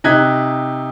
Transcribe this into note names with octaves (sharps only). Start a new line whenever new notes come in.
C3 D#4 F#6 G#6 B6